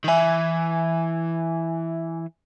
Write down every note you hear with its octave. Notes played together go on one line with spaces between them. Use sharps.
D#3
E3 E5 G#5